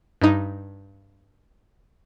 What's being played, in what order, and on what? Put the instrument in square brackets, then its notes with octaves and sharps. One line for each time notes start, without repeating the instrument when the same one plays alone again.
[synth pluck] G2 D#4